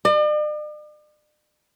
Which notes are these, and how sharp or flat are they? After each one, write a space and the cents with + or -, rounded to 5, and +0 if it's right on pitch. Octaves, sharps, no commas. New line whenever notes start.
D5 +45